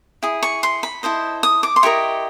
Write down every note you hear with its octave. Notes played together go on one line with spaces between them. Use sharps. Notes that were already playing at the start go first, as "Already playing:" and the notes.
E4 G#4
C#6
C6
B5
E4 A4 C5 D#5
D#6
D6
C6
E4 G4 A#4 D#5 C#6